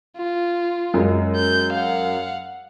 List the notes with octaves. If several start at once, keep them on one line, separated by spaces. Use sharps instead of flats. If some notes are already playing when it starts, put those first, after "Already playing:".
F4
F#2 G#3
G6
F5 F#5